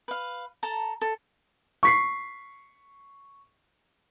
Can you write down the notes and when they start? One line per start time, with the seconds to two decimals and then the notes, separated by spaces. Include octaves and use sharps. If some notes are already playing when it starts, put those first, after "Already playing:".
0.08 B4 F5
0.63 A4 A5 A#5
1.01 A4
1.83 C#6 B6 C7